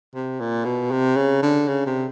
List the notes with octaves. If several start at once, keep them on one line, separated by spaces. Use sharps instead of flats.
C3
A#2
B2
C3
C#3
D3
C#3
C3